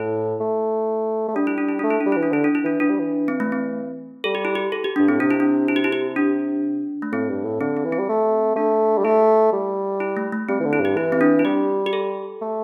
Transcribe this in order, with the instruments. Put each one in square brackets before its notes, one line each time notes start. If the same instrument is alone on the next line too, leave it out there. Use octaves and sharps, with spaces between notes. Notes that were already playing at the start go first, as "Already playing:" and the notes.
Already playing: [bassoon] A2 [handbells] E4
[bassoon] A3
A3
[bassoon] G3 [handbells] D4
[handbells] E4
D4
E4
[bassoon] A3 [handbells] D4
[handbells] E4
[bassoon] G3 [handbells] D4
[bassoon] E3 [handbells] E4
[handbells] D4
[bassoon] D3 [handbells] E4
[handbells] D4
E4
[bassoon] E3 [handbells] D4
[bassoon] E3 [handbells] D4
[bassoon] G3
E3
[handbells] C4
A3
C4
[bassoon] G3 [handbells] A4
[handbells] G4
E4
G4
A4
G4
[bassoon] G2 [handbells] D4
[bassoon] A2 [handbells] C4
[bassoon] C3 [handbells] D4
[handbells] E4
D4
E4
G4
E4
G4
D4
A3
[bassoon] A2 [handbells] C4
[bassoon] G2
A2
[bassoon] D3 [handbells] C4
[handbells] C4
[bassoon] E3
[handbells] C4
[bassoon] G3
A3
[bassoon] A3 [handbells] D4
[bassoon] G3
[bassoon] A3 [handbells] E4
[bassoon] G3
[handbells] E4
A3
A3
[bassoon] G3 [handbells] C4
[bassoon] E3
D3
[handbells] E4
[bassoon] G2 [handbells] G4
[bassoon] E3 [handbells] E4
[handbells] C4
D4
E4
[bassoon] G3 [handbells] G4
[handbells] G4
A4
[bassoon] A3